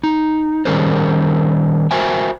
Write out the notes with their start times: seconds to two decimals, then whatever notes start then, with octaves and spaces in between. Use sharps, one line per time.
0.04 D#4
0.65 D#3 G3 C#4 G#4 A#4 C5
1.91 F#4 A#4 C5 E5 G5 G#5